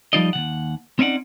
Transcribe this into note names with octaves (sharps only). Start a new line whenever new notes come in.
F3 G3 D#4 F4 D5 D#5
D#2 D#3 F#5
C4 C#4 D#4 D5 F#5